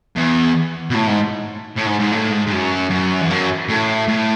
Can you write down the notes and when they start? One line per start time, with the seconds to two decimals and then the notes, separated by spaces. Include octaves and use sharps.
0.16 E2
0.90 B2
0.95 A2
1.08 G#2
1.77 A2
1.87 G#2
2.00 G#2
2.12 A2
2.32 G#2
2.47 G#2
2.51 F#2
2.90 F#2
3.21 E2
3.30 F#2
3.69 A2
4.08 A2